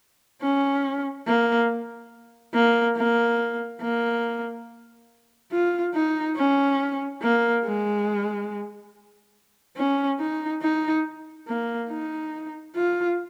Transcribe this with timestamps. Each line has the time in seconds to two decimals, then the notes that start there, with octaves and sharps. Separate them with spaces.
0.42 C#4
1.27 A#3
2.54 A#3
2.97 A#3
3.82 A#3
5.52 F4
5.95 D#4
6.37 C#4
7.22 A#3
7.65 G#3
9.77 C#4
10.19 D#4
10.62 D#4
11.48 A#3
11.90 D#4
12.75 F4